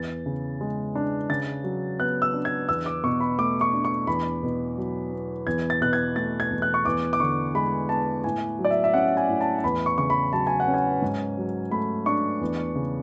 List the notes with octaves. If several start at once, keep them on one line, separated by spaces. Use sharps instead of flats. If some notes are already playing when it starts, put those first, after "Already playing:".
Already playing: E2 A6
C#3
G#3
D4
C#3 A6
F#3
B3 F#6
E6
D4
G#6
E2 E6
D6
B2 C#6
B5
A3 D6
C#6
D4
C#6
E2 B5
B2
F#3
B3
E2 G#6
A6
B2 F#6
G#6
A3 A6
G#6
E2
F#6
C#6
E2 D6
D6
D3 C#6
G#3 B5
B3 A5
A2 G#5
F#3
D5
E5
E5
C#4 F#5
G#5
A2
A5
A5
E2 B5
C#6
C#3 C#6
B5
F#3 A5
G#5
F#5
C#4
G#5
G#2
F#3
A3 B5
D4 C#6
E2
C#3